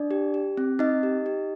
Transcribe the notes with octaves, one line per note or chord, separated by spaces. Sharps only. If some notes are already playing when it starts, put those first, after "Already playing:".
Already playing: D4 D5
G4
G4
C4
C4 D#4 D#5
G4
G4